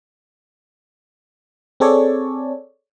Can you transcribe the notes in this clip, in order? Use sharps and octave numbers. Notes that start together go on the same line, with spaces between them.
C4 G#4 A4 C#5 D5